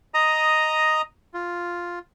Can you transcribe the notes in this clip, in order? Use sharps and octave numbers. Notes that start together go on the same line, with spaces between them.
D#5 A#5 D#6
F4